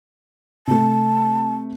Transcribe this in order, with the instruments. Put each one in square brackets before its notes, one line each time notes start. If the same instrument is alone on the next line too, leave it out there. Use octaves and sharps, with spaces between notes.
[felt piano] C3 A3 [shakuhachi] A5